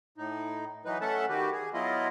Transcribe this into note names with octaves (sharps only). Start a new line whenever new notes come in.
A2 D#4
E3 F#3 D#4 B4
A3 C#4 A4 E5 F#5 A5
D#3 F#4 G4 B4
G#4
F#3 B3 E4 F4 D#5